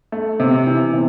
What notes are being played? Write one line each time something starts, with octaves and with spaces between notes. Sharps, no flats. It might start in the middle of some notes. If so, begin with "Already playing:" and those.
A3
C3
E3
C3